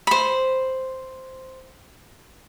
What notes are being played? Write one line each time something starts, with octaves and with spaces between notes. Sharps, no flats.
C5 B5